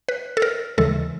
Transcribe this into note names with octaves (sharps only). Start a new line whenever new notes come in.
B4
A4
A#4
D#2 C#3 E3 G#3 A4